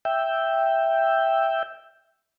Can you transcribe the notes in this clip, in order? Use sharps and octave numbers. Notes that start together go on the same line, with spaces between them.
E5 G5